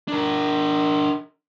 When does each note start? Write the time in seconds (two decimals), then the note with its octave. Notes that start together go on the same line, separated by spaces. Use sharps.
0.08 D4 A#4